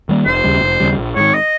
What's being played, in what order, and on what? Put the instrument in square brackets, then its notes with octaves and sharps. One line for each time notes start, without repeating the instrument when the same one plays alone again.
[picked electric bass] D#3 G3 A#3
[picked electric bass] F1 [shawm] C5
[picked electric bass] D#2 C#3 G3
F1
D#2 C#3 G3
A#1
[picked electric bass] G#2 D#3 [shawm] C#5
[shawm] D#5